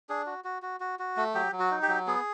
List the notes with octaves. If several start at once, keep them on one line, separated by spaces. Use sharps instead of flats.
D4 G#4
F#4
F#4
F#4
F#4
F#4
A3
F#3 G4
F#3
F#4
D#4
G4
F#3
B3 G#4